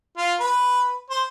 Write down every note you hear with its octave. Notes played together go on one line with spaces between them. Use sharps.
F4
B4
C5